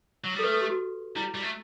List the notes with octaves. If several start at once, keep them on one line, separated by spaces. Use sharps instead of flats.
F#3
G3
A4
A3 B4
A4
G4
F#4
G3 E4
G3
A3